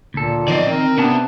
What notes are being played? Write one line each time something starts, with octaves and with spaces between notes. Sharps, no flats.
D2 A#2 A4
D#3 F3 C4 D5 D#5
D#3 C4 A#4
C3 B3 C#4 D4 A5